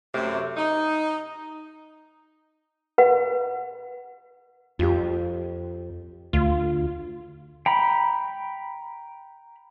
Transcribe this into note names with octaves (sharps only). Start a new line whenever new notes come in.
F#2 C3 F#3 A3
D#4
B4 F#5
F2 F4 G4
D2 F4
G5 A#5 B5